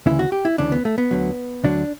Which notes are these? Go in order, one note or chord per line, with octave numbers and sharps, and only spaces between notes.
D2 C#3 E3 E4
F#4
G4
E4
D2 C#3 E3 D4
B3
A3
B3
D2 D3 F#3
D2 D3 F#3 D4